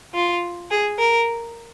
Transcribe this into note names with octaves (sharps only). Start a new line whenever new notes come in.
F4
G#4
A#4